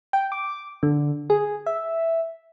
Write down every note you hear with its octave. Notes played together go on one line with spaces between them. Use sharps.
G5
D6
D3
G#4
E5